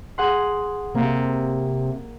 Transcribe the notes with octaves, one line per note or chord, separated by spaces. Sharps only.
G#4 F#5 C6
C3 A#3